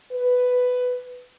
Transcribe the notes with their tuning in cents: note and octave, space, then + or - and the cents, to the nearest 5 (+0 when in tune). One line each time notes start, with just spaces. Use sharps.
B4 +10